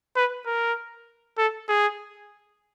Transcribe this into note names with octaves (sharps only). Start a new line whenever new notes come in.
B4
A#4
A4
G#4